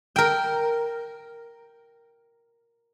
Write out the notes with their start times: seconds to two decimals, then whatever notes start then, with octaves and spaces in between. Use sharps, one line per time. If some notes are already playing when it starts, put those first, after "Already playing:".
0.16 A#4 G5